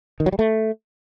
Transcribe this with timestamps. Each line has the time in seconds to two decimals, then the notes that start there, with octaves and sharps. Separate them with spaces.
0.20 D#3
0.26 F#3
0.32 G3
0.39 A3